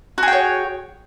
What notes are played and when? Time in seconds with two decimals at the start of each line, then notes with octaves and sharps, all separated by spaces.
0.18 F#4
0.23 G#4
0.28 G5
0.33 C#5